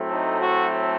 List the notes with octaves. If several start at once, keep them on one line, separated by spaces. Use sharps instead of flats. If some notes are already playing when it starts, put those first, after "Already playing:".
Already playing: A2 F#3 A3 C4
D#4
F#4